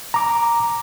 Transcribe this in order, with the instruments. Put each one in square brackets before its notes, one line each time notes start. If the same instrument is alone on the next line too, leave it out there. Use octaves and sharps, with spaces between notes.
[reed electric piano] A#5 D6